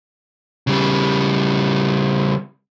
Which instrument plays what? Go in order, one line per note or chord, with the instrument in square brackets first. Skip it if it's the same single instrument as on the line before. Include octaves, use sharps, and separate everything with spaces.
[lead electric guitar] C#3 G3